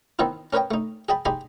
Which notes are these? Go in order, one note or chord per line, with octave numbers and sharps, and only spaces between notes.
D#3 E3 B3 C4 D#4 E4
C#4 A#4 B4 C#5 D#5 G5
A3 D#4
G#4 D#5 G5 A5 B5
D#4 G4 G#4 D#5 B5 C6